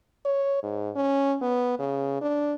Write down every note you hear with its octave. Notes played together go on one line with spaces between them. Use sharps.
C#5
G#2
C#4
B3
C#3
D4